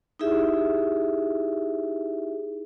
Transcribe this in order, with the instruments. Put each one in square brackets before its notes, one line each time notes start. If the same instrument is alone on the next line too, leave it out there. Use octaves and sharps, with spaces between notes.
[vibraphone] D#4 E4 G4 G#4 E5